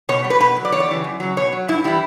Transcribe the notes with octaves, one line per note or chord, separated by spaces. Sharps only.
B2 C#5
G3
B4
B2 B4
F#3
D5
E2 C#5
D5
C#3 E3 G3
F#2
C#3 F#3
B2 C#5
F#3
G2 E4
E3 G3 E4